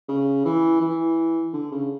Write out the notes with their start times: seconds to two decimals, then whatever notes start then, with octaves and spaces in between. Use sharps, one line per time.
0.09 C#3
0.45 E3
0.81 E3
1.53 D3
1.72 C#3